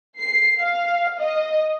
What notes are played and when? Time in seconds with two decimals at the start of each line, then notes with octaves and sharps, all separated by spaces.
0.19 C7
0.60 F5
1.19 D#5